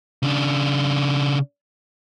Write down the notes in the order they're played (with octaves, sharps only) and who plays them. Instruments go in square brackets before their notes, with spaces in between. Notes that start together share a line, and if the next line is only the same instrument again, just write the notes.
[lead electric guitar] C#3 D4